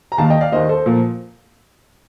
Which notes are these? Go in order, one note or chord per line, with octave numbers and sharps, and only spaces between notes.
A#5
D#2 D#3 A#3 F5 A5
D#5 G5
D5 F5
D#2 D#3 A#3 C5 D#5
A4 C5
A#2 F3 A#3